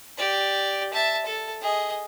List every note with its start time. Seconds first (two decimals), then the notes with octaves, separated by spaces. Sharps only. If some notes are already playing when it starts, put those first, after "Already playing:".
0.17 G4 D5
0.93 E5 A5
1.26 A4
1.62 G#4 D#5